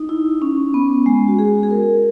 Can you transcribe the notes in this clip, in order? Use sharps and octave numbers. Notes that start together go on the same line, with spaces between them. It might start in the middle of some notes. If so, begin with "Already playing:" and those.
Already playing: D#4
E4
C#4
B3
G#3
F#4
G#4
G#4
A#4